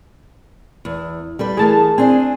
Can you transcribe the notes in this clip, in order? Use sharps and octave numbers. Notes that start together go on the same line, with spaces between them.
E2
G3 A4 B4
E3 A3 G#4 A#4 A5
C4 D4 G#4 G#5